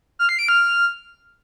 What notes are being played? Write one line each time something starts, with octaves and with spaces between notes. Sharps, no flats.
F6
C7
D7
F6